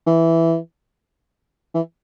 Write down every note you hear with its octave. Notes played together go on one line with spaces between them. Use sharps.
E3
E3